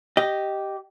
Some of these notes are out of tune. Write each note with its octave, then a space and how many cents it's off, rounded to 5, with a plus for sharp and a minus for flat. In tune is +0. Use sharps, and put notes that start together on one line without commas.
G4 -10 D#5 +0